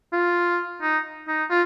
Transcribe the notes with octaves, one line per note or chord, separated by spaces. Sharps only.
F4
D#4
D#4
F4